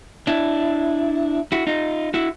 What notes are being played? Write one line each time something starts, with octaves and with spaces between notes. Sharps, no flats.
D4 E4
E4 F#4
D#4 F4
E4 F#4